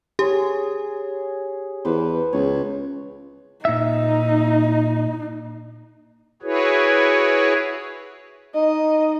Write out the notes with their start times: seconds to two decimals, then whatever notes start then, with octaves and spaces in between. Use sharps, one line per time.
0.19 G4 G#4 C#5
1.85 E2 B4 C5
2.33 C#2 C#5
3.65 A#2 D#4 E5
6.42 E4 F#4 G#4 B4 C#5
8.55 D#4 D#5